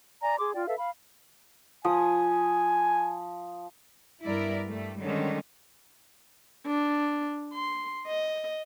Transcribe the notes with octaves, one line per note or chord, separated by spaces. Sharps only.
D5 G#5 A#5
G#4 C6 D6
F4 D5 G5
A4 B4 E5 F5
F5 B5
F3 G#5 D#6
G2 G3 B3 E4 A#4 D5
G2 G3 A3
D3 D#3 G3 G#3 C#4
D4
C6
D#5